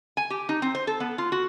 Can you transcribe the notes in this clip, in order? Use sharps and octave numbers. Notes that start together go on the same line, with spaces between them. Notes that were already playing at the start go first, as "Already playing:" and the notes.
G#5
G4
D#4
C4
C5
A4
B3
F4
F#4